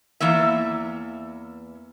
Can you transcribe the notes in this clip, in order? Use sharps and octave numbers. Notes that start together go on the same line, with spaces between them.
E2 E3 A#3 E5